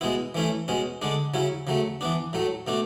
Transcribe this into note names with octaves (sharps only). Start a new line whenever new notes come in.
B2 G#3 B3 E4
E3 A3 C#4 E4
B2 G#3 C#4
D3 G#3 D4
C#3 F#3 C#4 E4
C#3 F#3 A3
E3 B3 D4
A2 F#3 A3
B2 A3 D4